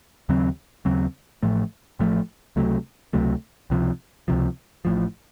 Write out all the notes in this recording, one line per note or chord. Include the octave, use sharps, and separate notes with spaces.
D#2 C#3 F#3 C4
D#2 C#3 F#3 C4
A1 A2 F3 A3
A1 A2 F3 A3
C#2 C3 F#3 A3
C#2 C3 F#3 A3
C#2 C3 F3
C#2 C3 F3
A1 A2 F3